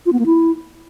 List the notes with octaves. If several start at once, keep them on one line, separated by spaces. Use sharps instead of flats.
F4
B3
A#3
E4